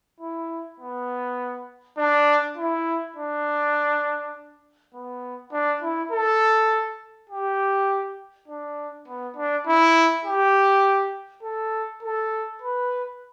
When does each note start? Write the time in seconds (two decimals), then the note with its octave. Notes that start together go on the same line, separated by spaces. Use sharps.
0.20 E4
0.80 B3
1.98 D4
2.57 E4
3.16 D4
4.94 B3
5.52 D4
5.82 E4
6.12 A4
7.30 G4
8.48 D4
9.08 B3
9.36 D4
9.67 E4
10.25 G4
11.43 A4
12.03 A4
12.62 B4